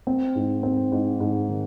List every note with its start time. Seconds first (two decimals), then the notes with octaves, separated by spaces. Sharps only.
0.07 C4
0.35 G#2
0.63 C4
0.92 G#2
1.20 G#2
1.49 D#3